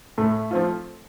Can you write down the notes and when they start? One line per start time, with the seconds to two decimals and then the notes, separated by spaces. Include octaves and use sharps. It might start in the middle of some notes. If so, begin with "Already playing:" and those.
0.18 A2 A3
0.51 F3 C4 F4